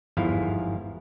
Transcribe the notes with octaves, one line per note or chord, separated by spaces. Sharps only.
G1 E2 G#2 F3 E4 F5